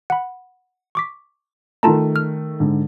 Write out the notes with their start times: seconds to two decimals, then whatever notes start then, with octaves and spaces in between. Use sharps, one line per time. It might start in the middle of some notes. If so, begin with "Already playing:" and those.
0.10 F#5 B5
0.95 C#6 D6 B6
1.83 D#3 A3 F4 A5 A#5
2.16 F6
2.60 G#2 D3